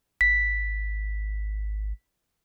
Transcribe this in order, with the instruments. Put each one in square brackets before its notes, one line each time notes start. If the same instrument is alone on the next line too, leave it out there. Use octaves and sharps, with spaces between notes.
[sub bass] G#1 [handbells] B6